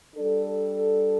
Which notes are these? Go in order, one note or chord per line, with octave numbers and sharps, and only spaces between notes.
G3 D4 A4